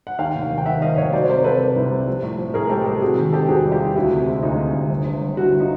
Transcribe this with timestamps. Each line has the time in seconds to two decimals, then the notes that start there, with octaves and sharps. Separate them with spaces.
0.07 F#5
0.18 D#2 F5 G5
0.35 F1
0.50 D#3
0.58 G5
0.66 D#3 E5 F#5
0.81 D#3 D#5 F5
0.97 F1 C#5 D#5
1.13 F#3 C5 D5
1.25 C#5
1.29 C3 A#4 C5
1.44 C3 A4 B4
1.60 C3
1.76 C2
1.91 C3
2.08 F3
2.23 A2
2.38 F3
2.54 A2 G#4 A#4
2.70 G#3 G4 A4
2.86 G#3 G4 A4
3.02 C3 F#4 G#4
3.18 D#3
3.32 C3 G4 A4
3.48 E2 F#4 G#4
3.64 G3
3.72 F4 G4
3.80 G3
3.96 D2 E4 F#4
4.12 C3
4.27 G#3
4.43 D2 D#4 F4
4.59 C3
4.74 D2
4.90 G1
5.06 G1
5.21 G1
5.37 G1 E4 F#4
5.60 D#4 F4